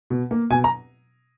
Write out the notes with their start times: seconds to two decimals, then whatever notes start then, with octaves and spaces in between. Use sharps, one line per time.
0.10 B2
0.31 A#3
0.50 B2 G#5
0.64 A#5